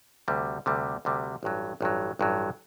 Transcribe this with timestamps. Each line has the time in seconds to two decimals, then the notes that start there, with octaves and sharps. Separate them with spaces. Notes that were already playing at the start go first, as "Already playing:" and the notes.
0.28 D2 C3 G3
0.66 D2 C3 G3
1.05 D2 C3 G3
1.43 A1 G2 F#3
1.81 A1 G2 F#3
2.19 A1 G2 F#3